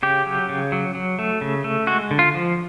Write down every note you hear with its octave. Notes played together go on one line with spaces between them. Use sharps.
C#3 G4
F#3
C#3
F#3
F#3
A3
C#3
A3
G#3 F#4
D3
F4
F3